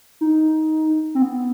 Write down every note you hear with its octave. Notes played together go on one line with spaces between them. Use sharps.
D#4
C4
B3